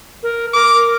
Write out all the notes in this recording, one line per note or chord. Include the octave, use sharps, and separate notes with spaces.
A#4
A#4 D6